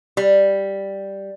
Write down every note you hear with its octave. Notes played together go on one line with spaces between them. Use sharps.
G3